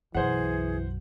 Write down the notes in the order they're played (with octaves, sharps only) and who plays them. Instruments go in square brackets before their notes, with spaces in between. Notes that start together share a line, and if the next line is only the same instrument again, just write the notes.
[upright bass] B1 F#2 [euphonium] E3 [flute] G#4 [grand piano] C5 F#5